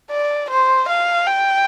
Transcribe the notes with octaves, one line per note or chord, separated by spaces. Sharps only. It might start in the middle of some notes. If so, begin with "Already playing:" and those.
D5
C5
F5
G5